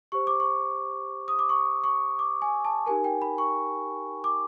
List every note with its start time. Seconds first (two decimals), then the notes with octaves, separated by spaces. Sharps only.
0.12 G4 C5 C#6
0.27 D6
0.40 C#6
1.28 D#6
1.39 D6
1.49 C#6
1.84 C#6
2.19 D6
2.42 G#5
2.65 A5
2.86 D#4 G4 A#4 G#5
3.04 G5
3.22 B5
3.38 C#6
4.24 D6